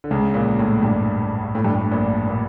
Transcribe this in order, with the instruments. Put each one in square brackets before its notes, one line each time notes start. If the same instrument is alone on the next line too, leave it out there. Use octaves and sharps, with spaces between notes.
[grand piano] D3
C#2 C#3
A#1 A#2
A2
G2
A2
G2
A2
A#1 A#2
A#2